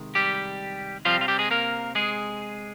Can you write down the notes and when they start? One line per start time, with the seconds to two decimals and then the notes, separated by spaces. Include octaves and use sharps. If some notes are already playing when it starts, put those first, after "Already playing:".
Already playing: C3 D#3 G#3
0.15 G3 G4
1.05 C3 F3 G3 C4 F4
1.21 F4
1.28 G3 G4
1.39 G#3 G#4
1.51 A#3 A#4
1.95 G#3 G#4